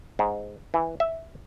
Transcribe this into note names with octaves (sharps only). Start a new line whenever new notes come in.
G#2
E3
E5